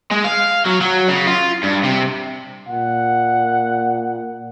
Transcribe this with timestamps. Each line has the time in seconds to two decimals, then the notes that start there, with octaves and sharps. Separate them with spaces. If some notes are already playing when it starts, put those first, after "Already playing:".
0.11 G#3
0.24 F5
0.65 F#3
0.81 F#3
1.09 C#3
1.27 F4
1.63 G2
1.83 C3
2.69 A#2 F#5